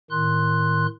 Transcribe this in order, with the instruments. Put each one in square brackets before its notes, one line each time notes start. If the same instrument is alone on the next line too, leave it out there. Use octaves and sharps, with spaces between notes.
[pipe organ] A2 D#3 C6 F#6